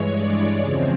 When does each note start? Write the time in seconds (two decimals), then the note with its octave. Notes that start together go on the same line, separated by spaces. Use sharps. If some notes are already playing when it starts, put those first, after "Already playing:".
Already playing: G2 E3 G#3 C#5
0.14 D5
0.60 E2 C#3 F3 G#3 C4